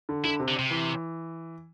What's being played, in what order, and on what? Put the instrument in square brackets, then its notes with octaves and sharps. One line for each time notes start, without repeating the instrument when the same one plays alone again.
[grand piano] D3
[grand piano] D3 [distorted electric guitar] E4
[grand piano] C3
[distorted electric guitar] D3
C3
[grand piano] E3